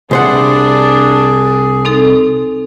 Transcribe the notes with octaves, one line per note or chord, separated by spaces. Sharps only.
C2 D4 G#4 C5 F#5
C4 D#4 A4